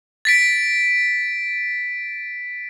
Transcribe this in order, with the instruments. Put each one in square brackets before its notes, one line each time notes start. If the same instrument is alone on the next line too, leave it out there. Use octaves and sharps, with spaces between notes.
[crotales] A6 B6 D7